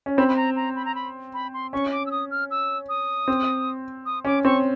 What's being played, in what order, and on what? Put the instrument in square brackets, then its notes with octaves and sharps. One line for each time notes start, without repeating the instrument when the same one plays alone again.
[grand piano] C#4
[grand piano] C4 [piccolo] B5
[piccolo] B5
A#5
A#5
B5
A#5
B5
B5
C6
[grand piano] C#4 [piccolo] C#6
[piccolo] D6
E6
D#6
F6
E6
D#6
[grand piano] C4
[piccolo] D#6
[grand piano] C#4 [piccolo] D6
[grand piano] C4 [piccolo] C#6